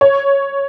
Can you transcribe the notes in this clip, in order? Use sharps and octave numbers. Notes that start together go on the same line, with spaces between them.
C#5